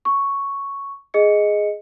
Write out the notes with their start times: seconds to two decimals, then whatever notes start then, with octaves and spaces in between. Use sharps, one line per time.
0.05 C#6
1.14 G#4 D#5 C#7